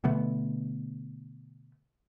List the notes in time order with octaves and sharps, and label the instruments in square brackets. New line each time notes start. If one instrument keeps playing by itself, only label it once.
[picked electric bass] B2 D3 A3 B3